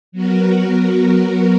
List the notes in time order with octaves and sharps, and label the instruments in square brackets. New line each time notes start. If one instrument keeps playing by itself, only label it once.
[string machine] F#3 B3 F#4 A#4